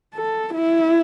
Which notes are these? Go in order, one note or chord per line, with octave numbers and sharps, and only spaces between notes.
A4
E4